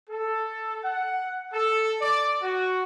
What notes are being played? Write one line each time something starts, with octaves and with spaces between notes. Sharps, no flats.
A4
F#5
A4
D5
F#4